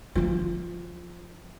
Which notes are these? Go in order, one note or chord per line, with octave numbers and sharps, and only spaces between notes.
F3 F4